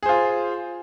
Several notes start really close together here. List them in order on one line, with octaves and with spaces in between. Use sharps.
G#4 C5 F4